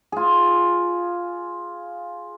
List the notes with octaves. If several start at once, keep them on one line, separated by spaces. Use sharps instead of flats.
F4 G#4